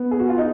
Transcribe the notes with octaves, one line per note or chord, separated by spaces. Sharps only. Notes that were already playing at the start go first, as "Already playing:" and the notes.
Already playing: B3
G#4
F#4
F4
D#4